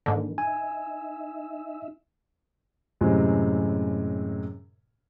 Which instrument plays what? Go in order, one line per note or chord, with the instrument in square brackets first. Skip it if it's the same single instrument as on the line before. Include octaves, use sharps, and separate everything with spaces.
[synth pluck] G#2 D3 [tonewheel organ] D#3 A#3
[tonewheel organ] D#4 E5 [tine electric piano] G#5
[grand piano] F#2 A2 C3 G#3